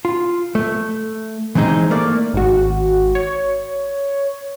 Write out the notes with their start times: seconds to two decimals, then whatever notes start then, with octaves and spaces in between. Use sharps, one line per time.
0.05 F4
0.55 A3
1.55 E3 G#3 C4 D#4 G#4
1.90 A3 A#3 D5
2.34 G#1 F#4
3.15 C#5